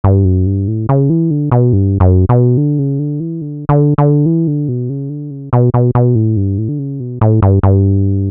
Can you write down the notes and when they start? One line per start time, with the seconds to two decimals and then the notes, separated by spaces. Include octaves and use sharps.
0.04 G2
0.25 F#2
0.46 G2
0.68 A2
0.89 C#3
1.10 E3
1.31 D3
1.52 B2
1.73 G2
2.00 F#2
2.29 B2
2.57 D3
2.79 C#3
2.99 D3
3.20 E3
3.41 D3
3.69 D3
3.98 D3
4.26 E3
4.47 D3
4.68 B2
4.90 C#3
5.09 D3
5.31 C#3
5.53 B2
5.74 B2
5.95 B2
6.15 A2
6.37 G2
6.58 A2
6.69 D3
6.79 C#3
7.00 B2
7.21 A2
7.42 G2
7.63 G2